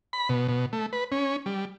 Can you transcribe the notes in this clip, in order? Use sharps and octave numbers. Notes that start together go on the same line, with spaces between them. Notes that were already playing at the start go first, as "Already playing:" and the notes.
B5
B2
B2
A3
B4
C#4
G3